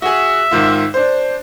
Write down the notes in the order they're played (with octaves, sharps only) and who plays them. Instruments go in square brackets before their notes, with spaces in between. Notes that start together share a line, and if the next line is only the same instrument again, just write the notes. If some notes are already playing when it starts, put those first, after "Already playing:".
[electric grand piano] F#4 G#4 [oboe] E5
[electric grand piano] G#2 D#3 F4
D4 C5